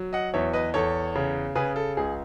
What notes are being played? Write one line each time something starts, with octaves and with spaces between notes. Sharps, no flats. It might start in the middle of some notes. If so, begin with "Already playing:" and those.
Already playing: F#3
D#5 F#5
E2 C#5 E5
B4 D#5
E2 A4 C#5
C#3
C#3 G#4 B4
A4
C#2 G#4